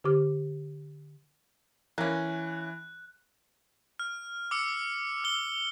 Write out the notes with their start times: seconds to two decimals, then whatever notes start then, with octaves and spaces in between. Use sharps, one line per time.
0.04 D3 G4 D6 F6
1.98 E3 A#3 C#4 F#6
3.99 F6
4.51 D6 E6 C#7
5.24 E6 G7